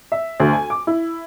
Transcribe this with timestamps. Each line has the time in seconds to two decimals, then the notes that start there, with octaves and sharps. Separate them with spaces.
0.12 E5
0.40 D2
0.53 G#5
0.70 D6
0.87 E4